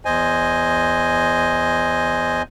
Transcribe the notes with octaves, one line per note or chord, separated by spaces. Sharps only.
E2 C5 D#5 G#5